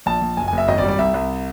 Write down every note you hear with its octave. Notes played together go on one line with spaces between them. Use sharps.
A#1 A5
A#1
F#1 G#5
F#1 G#5
E5
G#1 D#5
D5
G3
D5
C2 E5
C2